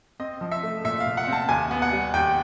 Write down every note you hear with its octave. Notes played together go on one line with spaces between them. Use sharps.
C4 D#5
F3
E5
A3
A#2 E5
F5
A#2
F#5
C4
A5
D#2 G#5
B3
F#5
G3
D#2 G5